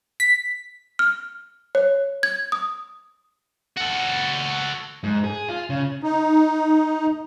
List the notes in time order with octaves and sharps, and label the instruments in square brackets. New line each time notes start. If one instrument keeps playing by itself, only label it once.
[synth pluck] B6
[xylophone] F6
C#5
G#6
D#6
[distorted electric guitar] F#4 A4
[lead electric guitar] G#2
G#4
F4
C#3
[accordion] D#4